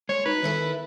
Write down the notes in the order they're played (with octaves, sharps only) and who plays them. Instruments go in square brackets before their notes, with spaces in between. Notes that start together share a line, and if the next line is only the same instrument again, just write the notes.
[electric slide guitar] G#3 [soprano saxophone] C#5
[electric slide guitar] D#4 F#4 [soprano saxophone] B4
[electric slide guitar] D#3 [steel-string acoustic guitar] B3 E4 A4